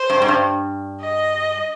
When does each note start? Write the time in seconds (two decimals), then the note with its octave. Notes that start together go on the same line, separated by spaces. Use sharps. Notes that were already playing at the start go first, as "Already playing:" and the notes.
Already playing: C5
0.10 G2
0.22 G#2
0.28 G2
1.01 D#5